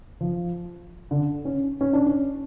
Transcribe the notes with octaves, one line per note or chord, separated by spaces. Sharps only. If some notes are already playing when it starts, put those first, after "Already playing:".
F3
D3
C#4
C#4
D4
C#4